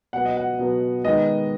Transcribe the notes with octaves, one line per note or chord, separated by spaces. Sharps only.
B2 F#3 B3 F#5
D#5
F#5
B2 F#3 B3
D#3 G#3 B3 D#5